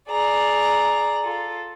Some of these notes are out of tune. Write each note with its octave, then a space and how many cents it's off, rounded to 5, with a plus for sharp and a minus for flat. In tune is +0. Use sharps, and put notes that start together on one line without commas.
G#4 +25 D5 +0 A#5 +0
F4 +0 A4 +0